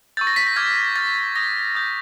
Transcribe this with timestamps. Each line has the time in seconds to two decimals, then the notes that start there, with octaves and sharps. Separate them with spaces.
0.17 C#6 E6 G6 A6
0.27 A#6
0.36 B6
0.47 A#6
0.56 D6 F6 G#6
0.96 D6 F6 A6
1.36 D#6 G6 A#6
1.75 D#6 G6